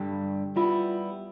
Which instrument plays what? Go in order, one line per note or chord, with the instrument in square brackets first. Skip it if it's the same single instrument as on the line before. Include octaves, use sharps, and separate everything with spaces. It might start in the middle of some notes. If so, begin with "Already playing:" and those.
Already playing: [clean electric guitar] G2 D3 G3
[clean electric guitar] G3 B3 E4 [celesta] F4